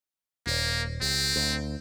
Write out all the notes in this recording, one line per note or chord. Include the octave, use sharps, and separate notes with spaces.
D#1 A#3
C#2 C4
D2